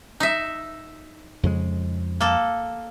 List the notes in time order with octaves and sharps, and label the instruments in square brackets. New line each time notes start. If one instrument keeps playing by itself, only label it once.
[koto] D#4 E5
[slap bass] F2 C#3 G#3
[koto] A#3 A4